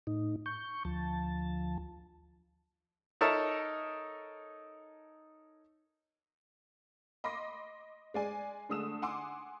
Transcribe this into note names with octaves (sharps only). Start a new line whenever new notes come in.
A2 D#4
C#6 G6
D2 F3 A5
D#4 A4 A#4 C#5 E5 A5
D#5 B5 C6 D6 A#6
G#3 D5 G#5
D3 G#3 A3 D#6 E6 E7
F#5 G#5 C6 D6 E6